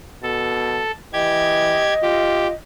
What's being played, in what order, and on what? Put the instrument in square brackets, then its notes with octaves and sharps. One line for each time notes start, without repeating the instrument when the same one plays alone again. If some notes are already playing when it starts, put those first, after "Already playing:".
[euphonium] B2 [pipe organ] A4
[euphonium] E3 [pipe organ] G4 G#6 [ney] D#5
[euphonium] F4 [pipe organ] G4